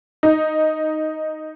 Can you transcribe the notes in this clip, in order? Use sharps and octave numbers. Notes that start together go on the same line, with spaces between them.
D#4